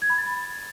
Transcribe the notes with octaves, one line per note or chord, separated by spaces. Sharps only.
G#6
B5
A6